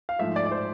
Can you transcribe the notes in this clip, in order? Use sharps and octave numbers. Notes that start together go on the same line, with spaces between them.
F5
G#2 F3 A3 E5
D5
D5
C5